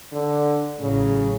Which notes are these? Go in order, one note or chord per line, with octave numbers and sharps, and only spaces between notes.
D3
A1 A2 C#3 F#3